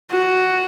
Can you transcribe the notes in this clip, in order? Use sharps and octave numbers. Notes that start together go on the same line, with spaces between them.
F#4